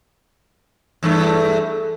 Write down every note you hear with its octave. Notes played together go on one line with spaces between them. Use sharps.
E2 G2 A3